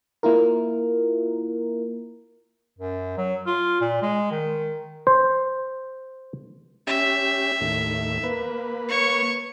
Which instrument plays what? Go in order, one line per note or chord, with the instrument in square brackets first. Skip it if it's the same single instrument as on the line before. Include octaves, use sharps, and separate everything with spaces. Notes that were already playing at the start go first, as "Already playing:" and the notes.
[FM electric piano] A#3 E4 F4 A#4
[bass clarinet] F#2
F#3
F4
A#2
G#3
D#3
[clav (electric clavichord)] C5
[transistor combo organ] C#4 G4 [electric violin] E5
[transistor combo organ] D#2 A2
A#3 B4
[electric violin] C#5 C#6